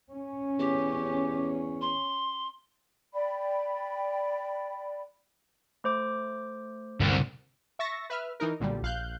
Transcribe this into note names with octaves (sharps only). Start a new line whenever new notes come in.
C#4
E2 G4
C6
D5 G5 B5
A3 C5 D6
D#1 C2 G2 D3
E5 C#6 A6 A#6
B4 E5 F6
E3 D#4 A#4
B1 A#2 D3 G3
A#1 F5 F#6 G6